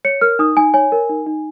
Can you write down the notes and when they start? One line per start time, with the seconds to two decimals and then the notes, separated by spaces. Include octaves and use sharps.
0.05 C#5 C#7
0.21 A#4 F6
0.39 D#4 D#6
0.57 D#4 G#5
0.74 C#5 G#5
0.92 A#4
1.09 D#4
1.27 D#4